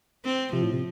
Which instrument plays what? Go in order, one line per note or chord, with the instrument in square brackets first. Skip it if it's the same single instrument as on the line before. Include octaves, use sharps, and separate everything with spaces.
[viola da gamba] C4
[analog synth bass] C3 [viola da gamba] F3
[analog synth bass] A2
C3